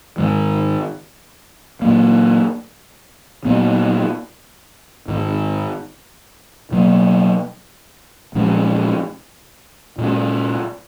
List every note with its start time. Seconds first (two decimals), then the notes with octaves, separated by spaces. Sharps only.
0.18 G#2 D#3 G#3
1.82 A#2 F#3 A#3
3.45 A#2 F#3 B3
5.08 G#2 D#3 G#3
6.72 B2 F#3 A#3
8.35 A#2 F3 G#3 C#4
9.98 A#2 G#3 C#4